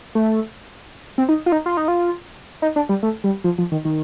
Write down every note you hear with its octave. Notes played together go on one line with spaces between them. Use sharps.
A3
C4
D#4
F4
D#4
F4
D#4
F4
D#4
D4
G3
A3
G3
F3
F3
D#3
D#3